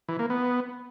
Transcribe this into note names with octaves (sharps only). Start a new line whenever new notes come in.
E3
A#3
B3